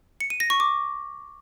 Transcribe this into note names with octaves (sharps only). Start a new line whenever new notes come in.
C#7
D#7
A#6
C#6
D6